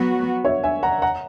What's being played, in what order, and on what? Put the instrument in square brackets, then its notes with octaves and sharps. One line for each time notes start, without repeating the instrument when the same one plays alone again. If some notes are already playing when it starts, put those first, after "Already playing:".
Already playing: [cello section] F#3 B3 F#4 [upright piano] F#5
[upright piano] C#5 E5
E5 G#5
F#5 A#5
F#5 A#5